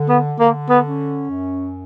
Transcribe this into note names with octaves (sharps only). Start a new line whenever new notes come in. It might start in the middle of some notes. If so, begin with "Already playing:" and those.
Already playing: D3
B3
D3 A#3
B3
C#4
F#2